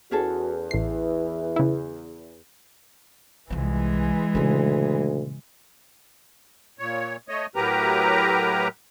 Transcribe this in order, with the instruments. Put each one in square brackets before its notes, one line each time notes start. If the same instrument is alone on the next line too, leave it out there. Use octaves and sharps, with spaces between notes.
[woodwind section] E2 [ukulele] C#4 G#4 A4 [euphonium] F#4
[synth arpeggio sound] A1 C7 [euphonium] E3
[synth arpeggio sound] C#3 E4
[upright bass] C2 F3 [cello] E3 G#3
[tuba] D2 [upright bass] A#2 C#3
[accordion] A#2 C#5
A3 C#5 D#5
A2 F#3 G4 A#4 B4 A#5